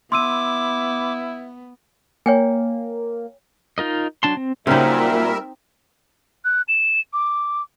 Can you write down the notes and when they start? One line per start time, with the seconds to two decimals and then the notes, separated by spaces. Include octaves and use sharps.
0.12 B3 E4 C6 D6 E6 D#7
2.26 A#3 C#5 G5 G#5
3.78 D#4 F4 A#4 D#5
4.23 F#3 D4 A5 C6
4.37 C4
4.67 A#2 C#3 F#3 G3 C4 D#4 A#4 E5
6.45 F#6
6.68 E7
7.13 D6